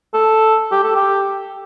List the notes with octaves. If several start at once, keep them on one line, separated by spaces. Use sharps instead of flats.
A4
G4
A4
G4